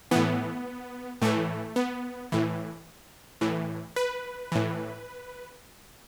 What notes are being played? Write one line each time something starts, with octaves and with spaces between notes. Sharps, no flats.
A2 E3 B3
A2 E3 A3
B3
A2 E3
A2 E3
B4
A2 E3